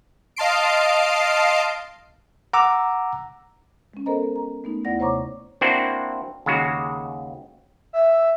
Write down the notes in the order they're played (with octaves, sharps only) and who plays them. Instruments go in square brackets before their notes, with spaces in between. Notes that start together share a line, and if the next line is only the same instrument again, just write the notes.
[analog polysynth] D#5 F5 A5 C6 C7 D7
[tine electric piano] F#5 A#5 D6 E6
[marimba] G#3 C#4
B3 A4 A#4 C5 D#5 A#5
A#5
A3 B3 D#4
D#2 B3 E4 D5 F#5 A#6
C3 C5 C#5 A#5 C#6 D6
[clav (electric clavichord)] A#3 C4 D4 E4 F#4 C5
D#2 C#3 G#3 F#4
[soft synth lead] E5